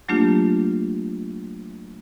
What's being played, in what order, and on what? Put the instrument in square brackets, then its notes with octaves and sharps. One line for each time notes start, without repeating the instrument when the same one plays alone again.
[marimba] F#3 A3 A#3 D4 F4 G4